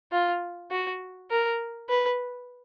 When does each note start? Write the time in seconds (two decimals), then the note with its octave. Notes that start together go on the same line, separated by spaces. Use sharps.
0.12 F4
0.71 F#4
1.31 A#4
1.90 B4